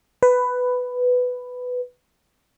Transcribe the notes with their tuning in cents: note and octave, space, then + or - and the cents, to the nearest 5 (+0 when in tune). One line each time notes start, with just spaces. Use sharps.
B4 +10